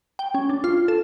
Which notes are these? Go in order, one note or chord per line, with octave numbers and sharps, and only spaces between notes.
G5
C#4
D4
F4
A4